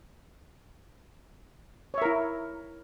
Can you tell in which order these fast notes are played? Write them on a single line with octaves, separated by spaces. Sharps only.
C#5 E5 A#4 E4